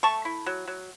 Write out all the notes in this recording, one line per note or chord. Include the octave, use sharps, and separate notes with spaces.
A3 A5 C#6
E4
F#3
F#3